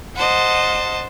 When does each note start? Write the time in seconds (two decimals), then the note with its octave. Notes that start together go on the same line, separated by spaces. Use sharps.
0.16 C5 D#5 F#5 A5